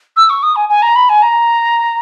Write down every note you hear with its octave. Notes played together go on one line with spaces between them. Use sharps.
E6
C#6
D#6
G#5
G#5
A#5
B5
G#5
A#5